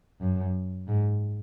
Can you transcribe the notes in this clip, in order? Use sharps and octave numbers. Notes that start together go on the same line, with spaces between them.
F#2
G#2